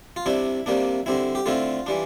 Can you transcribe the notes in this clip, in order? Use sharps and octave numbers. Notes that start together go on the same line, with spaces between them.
F4
C3 G3 D4 E4
C3 G3 A#3 D4
D3 G3 C4 E4
G4
D3 A3 C4 E4 F4
E3 G3 D4